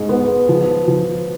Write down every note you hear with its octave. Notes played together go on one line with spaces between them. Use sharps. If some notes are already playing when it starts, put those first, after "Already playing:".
Already playing: G#2 G#3
B3
F3
F3